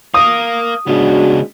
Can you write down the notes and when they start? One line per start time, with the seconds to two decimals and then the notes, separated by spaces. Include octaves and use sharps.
0.14 A#4 F5 D#6
0.87 C#3 G#3 B3 D4 F#4